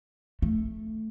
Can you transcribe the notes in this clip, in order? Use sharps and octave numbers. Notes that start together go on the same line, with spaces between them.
A3